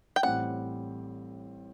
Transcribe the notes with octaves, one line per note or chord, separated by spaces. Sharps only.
G5
A1 A2 G3 C4 F#5